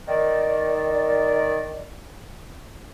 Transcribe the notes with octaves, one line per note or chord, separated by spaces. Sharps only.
D#3 D5